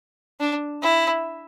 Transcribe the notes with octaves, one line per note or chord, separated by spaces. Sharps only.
D4
E4